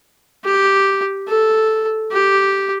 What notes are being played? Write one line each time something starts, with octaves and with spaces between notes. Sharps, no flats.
G4
A4
G4